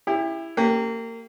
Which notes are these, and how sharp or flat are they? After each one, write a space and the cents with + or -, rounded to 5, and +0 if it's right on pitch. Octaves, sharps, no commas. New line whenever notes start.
E4 +5 G4 +35
A#3 -30 G4 +0